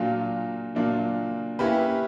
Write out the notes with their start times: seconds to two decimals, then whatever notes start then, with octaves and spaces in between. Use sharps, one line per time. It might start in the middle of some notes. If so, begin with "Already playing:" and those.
Already playing: A#2 F#3 A#3 D4 F4
0.75 A#2 F#3 A#3 D4 F4
1.59 A#3 C#4 E4 G4 B4